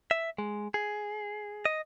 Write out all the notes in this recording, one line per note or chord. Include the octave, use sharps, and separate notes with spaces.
E5
G#3
G#4
D#5